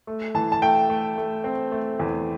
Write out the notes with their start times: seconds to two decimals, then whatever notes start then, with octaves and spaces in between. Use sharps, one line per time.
0.07 A3
0.35 E3 A5
0.52 A5
0.62 A3 G5
0.90 A3
1.18 A3
1.44 C4
1.72 A3
1.99 E2